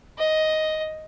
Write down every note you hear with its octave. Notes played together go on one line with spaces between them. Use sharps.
D#5